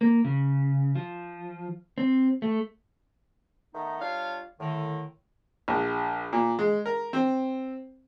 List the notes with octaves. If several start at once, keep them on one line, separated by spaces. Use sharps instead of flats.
A#3
C#3
F3
C4
A3
D#3 A3 B3 D#4
G3 D4 F4 C#5 F5
A2 D3 D#3
A#1
A#2
G#3
A#4
C4